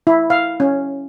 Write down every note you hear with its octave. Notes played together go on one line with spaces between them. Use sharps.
E4
F5
C#4